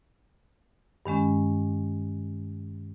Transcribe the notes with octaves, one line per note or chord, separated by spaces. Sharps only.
G2 D#3 G#3 C#4